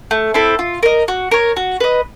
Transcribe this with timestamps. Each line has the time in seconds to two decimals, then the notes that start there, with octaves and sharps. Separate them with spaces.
0.11 A3
0.34 C4 E4 A4
0.59 F4
0.83 A#4 D#5
1.08 F#4
1.31 A#4 C#5
1.57 F#4
1.80 B4 D#5